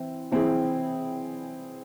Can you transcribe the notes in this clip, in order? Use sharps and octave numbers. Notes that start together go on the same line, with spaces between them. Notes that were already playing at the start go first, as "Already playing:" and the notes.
Already playing: E3 C4
E3 C4 E4 G#4